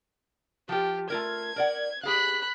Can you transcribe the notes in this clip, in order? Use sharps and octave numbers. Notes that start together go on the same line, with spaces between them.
F3 F4 G4
A3 F4 A#4 G#6
A#4 D5 F#5
G4 G#4 F5 B5 F#6